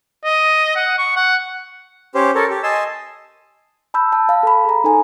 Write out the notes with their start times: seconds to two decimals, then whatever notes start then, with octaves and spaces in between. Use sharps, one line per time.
0.24 D#5
0.76 F#5
0.98 C#6
1.16 F#5
2.15 C#4 G4 C5
2.35 A4 A#4 C#5
2.50 G4
2.63 D#5 G#5 A5 C6 E6
3.94 A5 B5 E6 G6
4.13 A5
4.29 F5 A5
4.43 A4 B5
4.65 G#4 A#5
4.84 D#4 A4 G#5 A#5